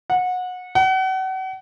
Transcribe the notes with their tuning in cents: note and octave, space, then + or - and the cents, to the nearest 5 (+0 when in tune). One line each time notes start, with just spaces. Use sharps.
F#5 -25
F#5 +35